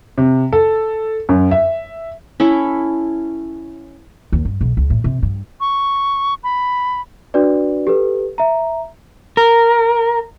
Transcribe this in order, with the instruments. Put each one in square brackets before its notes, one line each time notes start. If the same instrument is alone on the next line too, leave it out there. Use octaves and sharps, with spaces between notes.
[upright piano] C3
A4
F#2
E5
[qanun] C#4 E4 A4
[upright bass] D#2
G2
B1
C#2
A2
C3
G2
[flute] C#6
B5
[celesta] D4 F#4 B4 D5
G4 A4 B4
E5 A#5
[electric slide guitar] A#4